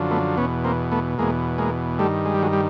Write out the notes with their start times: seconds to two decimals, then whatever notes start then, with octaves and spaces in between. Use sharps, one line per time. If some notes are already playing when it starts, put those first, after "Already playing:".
Already playing: F#2 D3 F3
0.10 A3 B3
0.37 E2 B2 B3 C#4
0.64 A#3 C4
0.91 A3 B3
1.18 E2 B2 G#3 A#3
1.58 G#3 A#3
1.99 G2 D#3 G3 A3
2.25 G#3
2.34 G3
2.43 F#3 G#3
2.53 G3